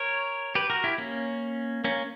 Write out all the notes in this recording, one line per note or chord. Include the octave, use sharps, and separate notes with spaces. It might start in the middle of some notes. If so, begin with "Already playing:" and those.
Already playing: A#4 C#5
G4 B4
F#4 A#4
E4 G4
A#3 C#4
A#3 C#4